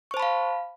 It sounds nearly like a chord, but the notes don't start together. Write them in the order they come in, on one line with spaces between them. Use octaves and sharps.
C#6 C5 A5 B5 F5